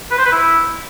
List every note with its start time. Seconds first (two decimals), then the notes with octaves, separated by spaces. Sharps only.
0.11 B4
0.18 C5
0.25 B4
0.32 E4